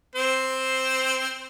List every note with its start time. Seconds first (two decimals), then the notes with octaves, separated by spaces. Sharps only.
0.15 C4 C5